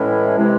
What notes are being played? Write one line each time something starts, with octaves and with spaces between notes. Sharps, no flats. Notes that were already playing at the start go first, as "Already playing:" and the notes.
Already playing: A2 E3 G#3 C#4 E4
C3 E3 G#3